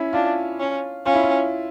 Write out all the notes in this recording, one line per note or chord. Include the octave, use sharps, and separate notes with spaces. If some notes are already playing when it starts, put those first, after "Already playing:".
Already playing: C#4 E4
D4 F4
C#4
C#4 F4
E4
F4